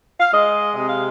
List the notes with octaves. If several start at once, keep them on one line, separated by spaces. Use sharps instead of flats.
F5
G#3 D#5
C3 D#5
F5